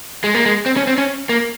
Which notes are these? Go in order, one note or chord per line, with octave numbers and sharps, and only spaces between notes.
G#3
A#3
G#3
C4
C#4
C4
C#4
A#3